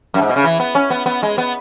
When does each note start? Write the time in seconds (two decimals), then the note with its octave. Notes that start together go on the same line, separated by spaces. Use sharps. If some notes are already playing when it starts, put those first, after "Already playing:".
0.14 F#2
0.22 G#2
0.29 B2
0.36 C#3
0.44 E3
0.60 B3
0.75 C#4
0.90 B3
1.06 B3
1.23 G#3
1.38 B3